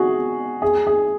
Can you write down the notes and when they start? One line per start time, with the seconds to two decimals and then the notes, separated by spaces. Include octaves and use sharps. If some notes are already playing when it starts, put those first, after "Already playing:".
Already playing: F#4 G#4
0.62 G#4
0.87 G#4